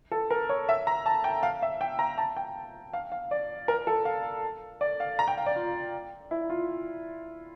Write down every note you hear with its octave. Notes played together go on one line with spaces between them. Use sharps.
A4
A#4
C#5
E5
A#5
A5
G5
F5
E5
G5
A#5
A5
G5
F5
F5
D5
A#4
A4
F5
D5
F5
A#5
G5
F5
D5
F4
E4
F4